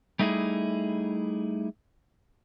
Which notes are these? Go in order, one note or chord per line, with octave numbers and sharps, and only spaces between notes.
G3 A3 D#4 E4 G#4